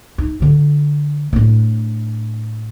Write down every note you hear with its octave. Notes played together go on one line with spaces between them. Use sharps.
D#4
D3 F4
A2 D4